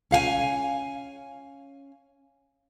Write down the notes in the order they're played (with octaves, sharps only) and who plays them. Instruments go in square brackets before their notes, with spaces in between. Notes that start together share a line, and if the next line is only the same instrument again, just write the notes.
[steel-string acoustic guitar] C#4 F5 F#5 G#5